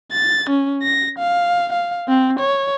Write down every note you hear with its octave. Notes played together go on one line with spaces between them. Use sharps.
A6
C#4
A#6
F5
F5
C4
C#5